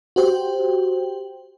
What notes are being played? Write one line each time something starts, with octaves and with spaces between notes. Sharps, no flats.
F#4 G4 C5 G5